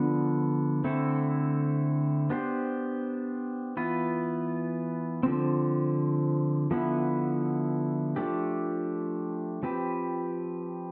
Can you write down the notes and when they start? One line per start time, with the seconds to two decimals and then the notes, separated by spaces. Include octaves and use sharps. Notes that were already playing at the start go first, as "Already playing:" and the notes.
Already playing: D3 F3 B3 D4
0.84 D3 A3 C4 E4 A4
2.30 B3 D4 G4 C5
3.77 E3 B3 F4 B4
5.23 D3 F3 C4
6.71 D3 F3 B3 E4
8.16 F3 A3 D4 G4
9.63 F3 C4 G4 B4